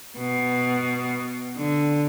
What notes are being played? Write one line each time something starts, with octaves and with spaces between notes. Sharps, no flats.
B2
D3